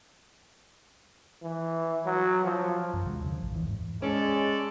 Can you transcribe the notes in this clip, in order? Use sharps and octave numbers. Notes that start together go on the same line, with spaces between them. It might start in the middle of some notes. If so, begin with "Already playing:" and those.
E3
F#3
F3
F#2 F3
D#2 C3 G#3
D3 E3 F3
A1 D#2
E2 E3
G#2
G#3 C#4 A4 D5